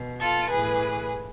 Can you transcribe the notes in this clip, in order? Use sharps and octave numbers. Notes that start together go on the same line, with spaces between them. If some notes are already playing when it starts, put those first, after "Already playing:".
Already playing: B2
F4 A4
A2 E3 G#4 B4